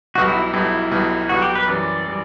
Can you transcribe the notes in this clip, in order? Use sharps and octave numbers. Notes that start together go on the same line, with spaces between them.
B1 B2 G3 F#4
E4
B1 B2 G3 E4
B1 B2 G3
B1 B2 G3 F#4
G4
B4
F#2 E3 G3 D5
E3 G3